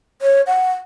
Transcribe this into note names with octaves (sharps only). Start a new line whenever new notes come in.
C#5
F#5